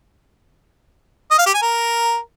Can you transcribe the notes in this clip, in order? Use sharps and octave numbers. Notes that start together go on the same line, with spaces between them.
D#5
F5
G4
G#5
A#4